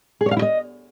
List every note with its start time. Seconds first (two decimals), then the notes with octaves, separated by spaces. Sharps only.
0.21 G#4
0.26 C#5
0.31 F5
0.37 E4
0.42 D#5